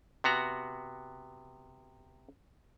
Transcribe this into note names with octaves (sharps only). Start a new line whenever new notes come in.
C3 B3 F#4 A#5